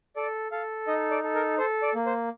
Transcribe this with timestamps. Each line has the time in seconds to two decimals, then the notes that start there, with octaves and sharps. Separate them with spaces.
0.16 A4 D5
0.52 A4 F5
0.87 D#4 D#5
1.11 D5
1.24 A4
1.35 A#4
1.58 A4 C5
1.83 D5
1.95 A#3
2.06 C5